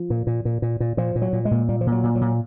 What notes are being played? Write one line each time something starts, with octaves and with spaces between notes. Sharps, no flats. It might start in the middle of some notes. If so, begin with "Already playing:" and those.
Already playing: F3
A#2
A#2
A#2
A#2
A#2
A#2 F3
A#2
F#3
A#2
G#3
A#2
A#2 G3
F3
A#2
F#3
A#2
F#3
A#2